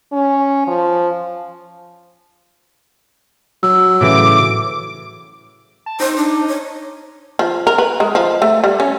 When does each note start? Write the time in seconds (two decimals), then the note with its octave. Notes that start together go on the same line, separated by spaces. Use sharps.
0.12 C#4
0.67 F3
3.63 F#3 E6
4.01 A2 C#3 E3 D6
5.86 A5
6.00 D#4 C5
6.17 D4
6.47 C#5
7.39 F3
7.67 A#4
7.78 B4
8.00 G#3
8.15 F3
8.42 A3
8.64 G3
8.80 C#4